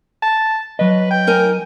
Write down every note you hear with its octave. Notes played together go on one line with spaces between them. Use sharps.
A5
F#3 B4 D#5
G5
D#4 A#4 G#5